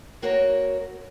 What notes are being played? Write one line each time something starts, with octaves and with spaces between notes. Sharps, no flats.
A#3 F#4 A#4 C#5